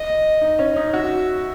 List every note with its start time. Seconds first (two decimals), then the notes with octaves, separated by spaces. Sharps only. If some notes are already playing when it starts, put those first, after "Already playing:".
Already playing: D#5
0.41 D#4
0.59 C#4
0.76 D#4
0.93 F#4 E5